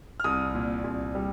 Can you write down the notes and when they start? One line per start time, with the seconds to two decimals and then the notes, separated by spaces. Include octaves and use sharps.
0.20 F6
0.24 C2 D#6
0.55 A#2
0.84 C2
1.15 G3